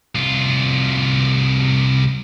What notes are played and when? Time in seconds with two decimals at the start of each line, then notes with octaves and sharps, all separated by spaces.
0.15 C2 F4